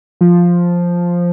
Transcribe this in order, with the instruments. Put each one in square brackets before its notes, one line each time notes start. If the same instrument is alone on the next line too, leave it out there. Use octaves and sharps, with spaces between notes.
[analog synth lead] F3